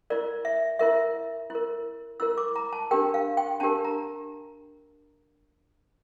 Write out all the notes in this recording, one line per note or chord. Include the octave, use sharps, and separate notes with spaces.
E4 A#4 D5
E5
E4 A#4 E5
E4 A#4
E4 A#4 E6
D6
A#5
A5
D4 G4 A#4 G5
F5
G5
D4 G4 A#4 A5
A#5